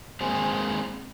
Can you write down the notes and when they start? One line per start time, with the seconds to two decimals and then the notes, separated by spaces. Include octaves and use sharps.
0.21 G#3 A#3 C4 C5 G#5